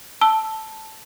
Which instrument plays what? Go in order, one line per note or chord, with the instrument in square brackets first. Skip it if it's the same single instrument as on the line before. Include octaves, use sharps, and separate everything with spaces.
[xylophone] A5 E6 G7